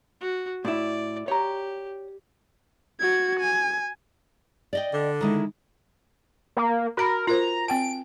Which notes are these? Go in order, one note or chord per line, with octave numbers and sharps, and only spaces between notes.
F#4
A2 E4 D5
G4 C#5 A#5
F#4 G#6
G#5
D5 D#5 G5
D3
D#3 G#3 E4
A#3
F#4 A#4 A#5 B5
F4 A#4 C5 A#5
C4 G5 A5 D7